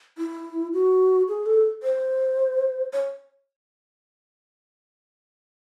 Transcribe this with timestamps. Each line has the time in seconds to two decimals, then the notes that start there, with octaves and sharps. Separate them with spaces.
0.18 E4
0.73 F#4
1.29 G#4
1.46 A4
1.83 C5
2.93 C#5